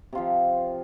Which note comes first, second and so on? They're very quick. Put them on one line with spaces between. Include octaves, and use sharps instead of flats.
C3 F4 F3